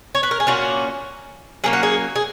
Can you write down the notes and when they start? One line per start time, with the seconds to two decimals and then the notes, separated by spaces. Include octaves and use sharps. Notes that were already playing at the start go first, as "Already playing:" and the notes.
0.15 C#5
0.23 B4
0.31 A#4
0.40 G#4
0.47 A#2 A#3 C#4 F#4
1.64 F#3 A#3 C#4 G#4
1.73 F#4
1.83 G#4
2.16 G#4